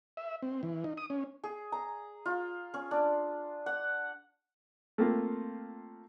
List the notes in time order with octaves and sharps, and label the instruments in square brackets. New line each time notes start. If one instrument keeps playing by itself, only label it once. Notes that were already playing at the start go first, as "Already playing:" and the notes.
[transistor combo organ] E5
C4
E3
D#4
D#6
C#4
[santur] G#4
A#5
F4
C#4
D4
F#5
[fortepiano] A3 A#3 C4 F4